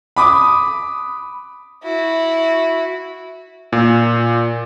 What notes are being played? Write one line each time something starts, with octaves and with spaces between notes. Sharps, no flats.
B5 D6 D#6
E4 F#4
A#2